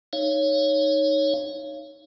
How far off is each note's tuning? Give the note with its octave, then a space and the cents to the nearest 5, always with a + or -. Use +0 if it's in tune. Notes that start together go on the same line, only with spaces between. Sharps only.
D#4 +0 C#5 +0 F5 -35